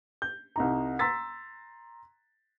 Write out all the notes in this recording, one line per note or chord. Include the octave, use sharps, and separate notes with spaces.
G6
C2 D#4 A#5
A#5 C6 E6 A6 B6